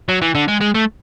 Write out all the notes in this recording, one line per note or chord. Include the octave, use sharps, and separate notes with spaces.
F#3
E3
D3
G#3
G#3
A3